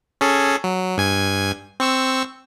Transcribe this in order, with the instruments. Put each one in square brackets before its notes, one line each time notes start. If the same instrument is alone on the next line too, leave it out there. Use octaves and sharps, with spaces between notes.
[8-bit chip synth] C#4 G#4 A4
F#3
G2 G#5 G#6
C4 C#6 E6